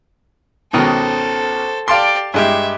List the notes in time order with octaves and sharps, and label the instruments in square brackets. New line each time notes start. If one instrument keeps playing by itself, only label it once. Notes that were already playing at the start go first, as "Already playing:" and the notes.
[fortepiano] C#2 B2 D#3 [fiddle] A4 C5
[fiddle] G4 D5 [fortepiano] F5 A5 C6
[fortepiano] G2 G#3 G4 [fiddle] E5